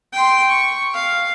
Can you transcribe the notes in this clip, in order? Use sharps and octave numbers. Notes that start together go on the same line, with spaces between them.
G5 C6
C#6
F5